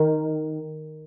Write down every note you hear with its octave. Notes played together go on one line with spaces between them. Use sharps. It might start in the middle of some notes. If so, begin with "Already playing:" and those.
Already playing: D#3